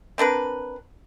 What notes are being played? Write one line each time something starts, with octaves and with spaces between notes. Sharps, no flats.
C4 D4 A#4 B4